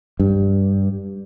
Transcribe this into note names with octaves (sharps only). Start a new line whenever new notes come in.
G2